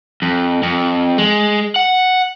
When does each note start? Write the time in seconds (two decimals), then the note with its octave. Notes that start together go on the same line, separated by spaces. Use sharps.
0.22 F2
0.63 F2
1.18 G#3
1.76 F#5